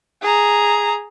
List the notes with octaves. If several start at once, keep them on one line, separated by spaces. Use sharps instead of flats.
G#4 A#5